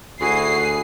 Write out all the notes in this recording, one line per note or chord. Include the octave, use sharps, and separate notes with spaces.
D2 E4 F#4 G#4 G#5 C7